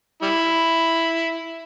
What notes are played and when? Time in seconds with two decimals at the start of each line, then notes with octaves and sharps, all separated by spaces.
0.22 G3 E4